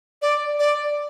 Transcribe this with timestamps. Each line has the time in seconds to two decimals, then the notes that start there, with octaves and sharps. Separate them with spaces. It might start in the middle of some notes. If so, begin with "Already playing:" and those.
0.22 D5
0.59 D5